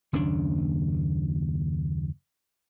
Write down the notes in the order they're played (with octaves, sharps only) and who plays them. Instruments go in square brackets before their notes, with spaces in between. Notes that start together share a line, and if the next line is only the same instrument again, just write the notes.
[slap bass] F#1 D#2 C#4 D4